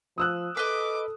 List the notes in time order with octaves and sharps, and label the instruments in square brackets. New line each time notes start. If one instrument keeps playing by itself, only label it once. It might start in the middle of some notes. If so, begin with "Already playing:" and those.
[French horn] F3 [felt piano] D#6 E6 F#6
[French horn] A4 [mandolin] B4 D#5 [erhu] D6